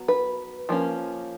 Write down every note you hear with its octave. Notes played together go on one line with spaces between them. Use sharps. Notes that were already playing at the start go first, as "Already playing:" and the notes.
Already playing: F#3 B3
B4
F3 A#3 C#4